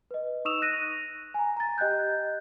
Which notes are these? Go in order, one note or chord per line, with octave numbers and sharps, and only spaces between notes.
B4 D#5
D#4 C#6 D#6 E6 E7 F7
F#6 A#6 D#7
G#5 A#5
A#5 A6
G4 D#5 G5 F#6 G6